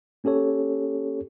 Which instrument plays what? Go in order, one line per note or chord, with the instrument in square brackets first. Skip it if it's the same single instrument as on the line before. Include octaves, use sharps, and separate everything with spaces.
[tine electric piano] A#3 C#4 G4 A4 C#5